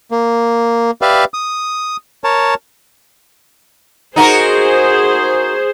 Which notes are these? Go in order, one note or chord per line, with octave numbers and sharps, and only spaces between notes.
A#3
G4 B4 D5 E5 F5
D#6
A#4 C#5 A5
D#4 F#4 G#4 A#4 C5